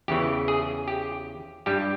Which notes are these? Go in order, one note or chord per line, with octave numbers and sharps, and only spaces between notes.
E2 C#3 E3 G4
G#4
G4
G2 G3 G4